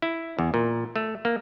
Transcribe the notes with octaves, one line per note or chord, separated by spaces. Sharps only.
E4
E2
A#2
A3
A#3